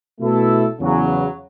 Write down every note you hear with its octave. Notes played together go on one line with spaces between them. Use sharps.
B2 A3 E4 A4
E2 C#3 F#3